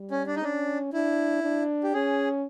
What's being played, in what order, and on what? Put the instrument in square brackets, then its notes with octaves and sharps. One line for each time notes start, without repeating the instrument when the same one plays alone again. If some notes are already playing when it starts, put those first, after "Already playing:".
Already playing: [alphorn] G3
[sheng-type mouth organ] C#4
D4
D#4
[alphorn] C#4 [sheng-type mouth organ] D4
[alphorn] D4 [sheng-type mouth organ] E4
[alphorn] D4
[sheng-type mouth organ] G4
[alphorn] C#4 [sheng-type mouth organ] G#4